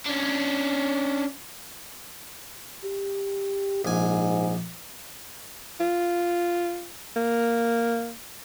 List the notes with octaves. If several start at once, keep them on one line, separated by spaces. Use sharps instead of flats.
C#4 D4
G4
A#1 G#2 G#5
F4
A#3